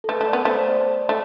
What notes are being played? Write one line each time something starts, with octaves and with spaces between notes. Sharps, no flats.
A4
A3 B4
A3
D5
B3
A3 C5
C5
D5
A3